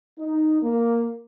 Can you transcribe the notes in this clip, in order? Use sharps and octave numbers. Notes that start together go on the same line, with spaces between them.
D#4
A#3